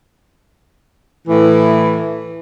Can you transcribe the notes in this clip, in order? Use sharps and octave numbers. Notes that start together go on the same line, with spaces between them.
A2 E3